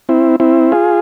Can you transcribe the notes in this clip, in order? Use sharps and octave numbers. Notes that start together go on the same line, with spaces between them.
C4 E4
C4 E4
F4 G#4